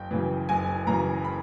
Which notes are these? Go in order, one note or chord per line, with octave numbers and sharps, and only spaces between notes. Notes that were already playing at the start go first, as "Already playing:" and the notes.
Already playing: F#1 G5
F#2 C#3 E3
F#1 G#5
F#2 C#3 E3 A#5
B5